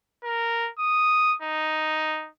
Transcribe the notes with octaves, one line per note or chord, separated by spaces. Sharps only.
A#4
D#6
D#4